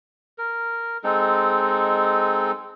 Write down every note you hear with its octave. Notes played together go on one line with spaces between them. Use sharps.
A#4
G#3 C4 D#4 A4